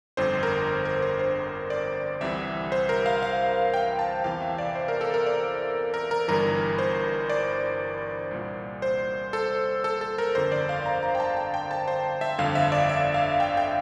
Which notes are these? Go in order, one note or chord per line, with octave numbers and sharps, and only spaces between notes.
G1 F2 D3 C5
A#4
A#4
C5
C5
D5
C2 C3 E3 E5
C5
A#4
F5
F5
G5
A5
E2 C3 E3 F5
E5
D5
C5
A#4
A4
A#4
D5
A#4
A#4
G1 G2 E3 A#4
C5
D5
C2 A#2
C5
A4
A4
A4
A#4
G1 F2 D3 C5
D5
F5
A#5
A#5
G5
A5
G5
G5
A5
C5
E5
G1 F2 D3 F5
E5
D5
E5
F5
G5
G5